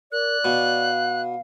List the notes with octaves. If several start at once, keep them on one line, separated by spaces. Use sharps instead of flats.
A#4 D5 F#6
B2 F5